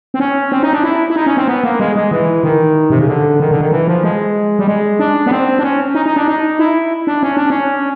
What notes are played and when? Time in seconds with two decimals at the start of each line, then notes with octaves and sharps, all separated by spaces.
0.14 C4
0.20 C#4
0.52 C4
0.63 D#4
0.73 D4
0.83 E4
1.10 E4
1.16 D#4
1.26 C#4
1.37 C4
1.48 B3
1.64 A#3
1.80 G#3
1.96 G#3
2.11 E3
2.44 D#3
2.90 C3
2.99 C#3
3.08 D3
3.40 D#3
3.51 D3
3.61 D#3
3.72 E3
3.87 F3
4.04 G#3
4.59 G3
4.67 G#3
4.99 D4
5.26 B3
5.31 C4
5.59 D4
5.63 C#4
5.95 D#4
6.06 D#4
6.16 D4
6.28 D#4
6.59 E4
7.07 D4
7.23 C#4
7.37 D4
7.50 C#4